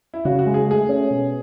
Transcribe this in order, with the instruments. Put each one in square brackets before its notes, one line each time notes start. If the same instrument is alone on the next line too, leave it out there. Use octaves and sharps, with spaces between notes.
[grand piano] E4
[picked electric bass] C#3 [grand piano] F#4
[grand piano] F#4
[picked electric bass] G#3
[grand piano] G#4
[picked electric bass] A3 [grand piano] G#4
[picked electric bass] C#4
B2